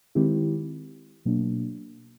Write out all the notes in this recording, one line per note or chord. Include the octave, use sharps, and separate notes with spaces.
D#3 G#3 C4 E4 G4
B2 F#3 A#3 D4